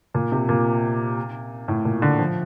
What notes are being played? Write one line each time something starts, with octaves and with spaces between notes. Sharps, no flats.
A#2
C3
A#2
A2
A#2
D3
F3